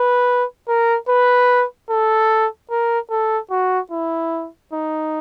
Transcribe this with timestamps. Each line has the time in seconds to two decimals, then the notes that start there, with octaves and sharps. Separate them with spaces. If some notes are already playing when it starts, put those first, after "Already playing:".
Already playing: B4
0.69 A#4
1.09 B4
1.90 A4
2.71 A#4
3.10 A4
3.51 F#4
3.92 E4
4.73 D#4